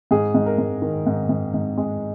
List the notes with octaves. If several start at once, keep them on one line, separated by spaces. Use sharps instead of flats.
G#2 G#4
G#2
A#4
G#2
D#3
G#2
G#2
G#2
G#3